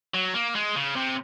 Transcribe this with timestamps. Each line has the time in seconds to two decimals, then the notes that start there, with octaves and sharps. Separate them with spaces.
0.14 F#3
0.34 A#3
0.55 G#3
0.76 C#3
0.96 C3